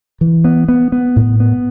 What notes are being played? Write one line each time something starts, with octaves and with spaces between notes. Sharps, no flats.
E3
B3
B3
B3
A2
B3